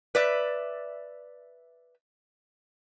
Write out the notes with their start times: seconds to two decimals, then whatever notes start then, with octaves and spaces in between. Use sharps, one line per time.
0.15 B4 D5 E5